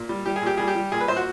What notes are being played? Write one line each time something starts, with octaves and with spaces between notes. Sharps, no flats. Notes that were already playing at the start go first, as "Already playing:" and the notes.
Already playing: A#2
G3
G3 G4
G#4
A#2 G4
G3 G#4
G4
G3
A#2 G#4
B4
A#2 C5
F#4